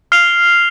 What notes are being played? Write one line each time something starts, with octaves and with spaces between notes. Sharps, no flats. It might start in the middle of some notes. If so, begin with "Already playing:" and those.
F6 C7 F7